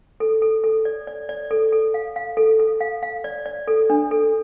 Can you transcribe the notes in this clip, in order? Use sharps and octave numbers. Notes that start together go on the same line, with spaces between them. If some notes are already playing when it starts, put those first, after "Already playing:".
A4
A4
A4
D5
D5
D5
A4
A4
F5
F5
A4
A4
F5
F5
D5
D5
A4
D4
A4